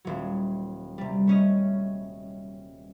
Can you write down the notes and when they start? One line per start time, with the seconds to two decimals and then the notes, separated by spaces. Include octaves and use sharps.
0.05 D#1 F#3
0.98 C3 G3
1.27 A3 C#4 D#5